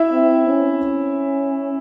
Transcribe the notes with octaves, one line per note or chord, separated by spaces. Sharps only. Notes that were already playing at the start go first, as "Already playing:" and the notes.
Already playing: E4 E5
C4
C#4